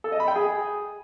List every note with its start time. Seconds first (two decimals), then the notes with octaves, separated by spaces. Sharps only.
0.04 A4
0.12 D#5
0.20 B5
0.28 G5
0.36 G#4